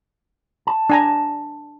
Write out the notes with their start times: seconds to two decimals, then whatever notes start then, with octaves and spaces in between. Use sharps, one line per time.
0.67 A5
0.90 D4 G#5 A#5